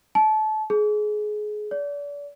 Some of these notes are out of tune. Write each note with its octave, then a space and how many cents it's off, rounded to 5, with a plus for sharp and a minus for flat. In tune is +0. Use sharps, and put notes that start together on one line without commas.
A5 -25
G#4 +25
D5 -35